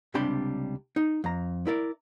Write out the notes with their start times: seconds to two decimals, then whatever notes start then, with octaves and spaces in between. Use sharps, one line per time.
0.14 C#2 C3 G3 D4 G5 B5
0.96 D#4
1.24 F2 A#5
1.67 E4 A#4 D5